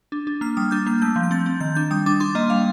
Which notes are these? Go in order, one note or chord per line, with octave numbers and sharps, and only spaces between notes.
D4
D4
A#3 F6
G3 D#6
D4 G6
A#3 G6
A3 G6
F3
G6
C4 A6
C4
D#3 G6
D4 G6
G3 D#6
D4 D6
D4 C6
A#3 D#5
G3 F5